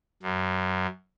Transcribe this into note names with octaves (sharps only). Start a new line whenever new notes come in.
F#2